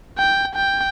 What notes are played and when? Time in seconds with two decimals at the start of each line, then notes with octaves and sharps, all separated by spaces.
0.18 G5
0.55 G5